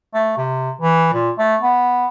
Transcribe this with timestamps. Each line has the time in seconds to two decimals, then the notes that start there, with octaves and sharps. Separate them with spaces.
0.14 A3
0.38 C3
0.81 E3
1.13 A#2
1.38 A3
1.62 B3